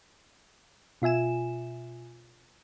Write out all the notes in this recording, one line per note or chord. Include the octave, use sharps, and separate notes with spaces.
B2 F4 E5 G#5 E7